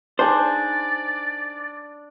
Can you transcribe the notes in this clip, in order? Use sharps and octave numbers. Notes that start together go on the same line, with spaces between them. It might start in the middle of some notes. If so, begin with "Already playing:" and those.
D4 D#4 G#4 C5 D5